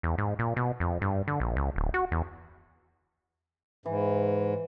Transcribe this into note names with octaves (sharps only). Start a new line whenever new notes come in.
E2
G#2
A#2
B2
F2
G2
D3
A#1
C#2
D1
F#4
E2
G#2 E3